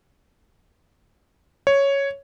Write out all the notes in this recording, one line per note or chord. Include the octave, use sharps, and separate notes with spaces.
C#5